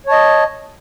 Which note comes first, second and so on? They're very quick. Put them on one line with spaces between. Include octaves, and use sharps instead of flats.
C#5 A5 D#5